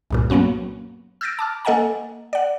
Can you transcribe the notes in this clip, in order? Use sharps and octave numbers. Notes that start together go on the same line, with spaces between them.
C2 G2 A#2
F#3 A#3 B3 C#4 F#4
E6 F6 G6 A6 A#6 D7
A5 D6 F6
A#3 A4 D#5 F#5 G#5 A#5
D5 F#5